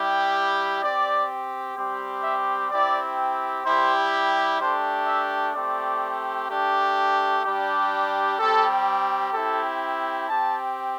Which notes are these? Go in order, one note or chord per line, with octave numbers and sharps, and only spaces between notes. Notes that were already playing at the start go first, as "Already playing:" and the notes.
Already playing: G3 E4 G4
C4 G4 D5
G3 C4 G4
E5
C4 E4 G4 D5
G3 E4 G4 C5
A3 D4 G4 C5
E5
A3 C4 G4 D5
A3 D4 G4
G3 D4 G4
G3 C4 G4 A4
C4 E4 G4 A4
C4 G4 A5